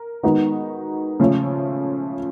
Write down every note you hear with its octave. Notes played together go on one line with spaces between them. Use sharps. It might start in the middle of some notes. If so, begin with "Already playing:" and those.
Already playing: A#4
D#3 G#3 B3 D#4 F#4
C#3 F3 A3 C#4